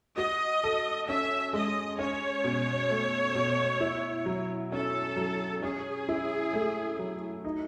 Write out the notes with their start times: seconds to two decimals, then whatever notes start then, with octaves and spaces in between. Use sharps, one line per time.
0.18 F#4 D#5
0.64 A4
1.08 C#4 E5
1.53 G#3 D#5
1.99 C#4 C#5
2.44 B2
2.90 A3
3.35 B2
3.81 E4
4.26 F#3
4.72 C#4 A4
5.17 F#3
5.62 C#4 G#4
6.09 E4
6.53 A3
6.99 F#3
7.45 D#4